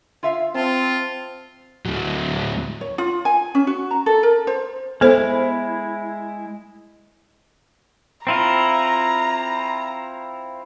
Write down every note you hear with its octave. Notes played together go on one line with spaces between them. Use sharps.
F4 E5 F5
C4 F4 A5
D2 F#3
C#5
F4
G#5
C#4
F#4
A#5
A4
A#4
C5
G#3 B3 E4 A4 C5
C4 E4 F4 A#5